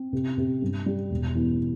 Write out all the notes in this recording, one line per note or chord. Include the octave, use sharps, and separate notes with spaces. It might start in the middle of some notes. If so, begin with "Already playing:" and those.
Already playing: C4
C3
C3
G2
G3
E1
E2